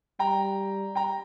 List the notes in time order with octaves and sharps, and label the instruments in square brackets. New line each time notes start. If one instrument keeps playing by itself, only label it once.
[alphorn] G3 [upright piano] G5 A#5
[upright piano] G5 A#5